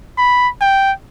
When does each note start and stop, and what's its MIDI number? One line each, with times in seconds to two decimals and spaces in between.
0.18 0.49 83
0.61 0.92 79